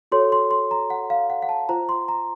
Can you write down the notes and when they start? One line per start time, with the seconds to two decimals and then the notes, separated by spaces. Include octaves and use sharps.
0.12 F#4 A4 C#5 C6
0.32 C6
0.51 C6
0.71 A#5
0.90 F#5
1.10 F5
1.30 F#5
1.42 F#5
1.49 A5
1.69 F4 C5 A#5
1.89 C6
2.08 A#5